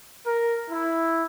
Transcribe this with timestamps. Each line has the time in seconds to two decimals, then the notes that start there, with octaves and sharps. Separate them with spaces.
0.25 A#4
0.70 E4